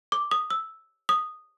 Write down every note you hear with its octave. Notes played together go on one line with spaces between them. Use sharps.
D6
D#6
E6
D#6